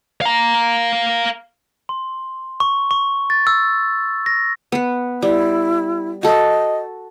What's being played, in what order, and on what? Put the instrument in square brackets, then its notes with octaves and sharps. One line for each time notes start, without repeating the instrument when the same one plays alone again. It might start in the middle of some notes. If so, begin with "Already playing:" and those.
[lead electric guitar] F5 A#5
[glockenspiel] C6
C#6
C#6
A6
E6
A#6
[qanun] B3 B4
[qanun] G3 [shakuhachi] E4
[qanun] F#4 A4 [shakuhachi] D#5